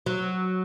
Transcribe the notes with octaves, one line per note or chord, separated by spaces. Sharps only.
F#3